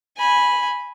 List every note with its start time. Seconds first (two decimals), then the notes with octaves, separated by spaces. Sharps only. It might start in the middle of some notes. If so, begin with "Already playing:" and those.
0.17 G#5 B5